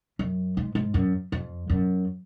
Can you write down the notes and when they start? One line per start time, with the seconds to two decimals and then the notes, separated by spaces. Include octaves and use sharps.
0.19 F#2
0.57 G#2
0.75 G#2
0.94 F#2
1.32 F2
1.70 F#2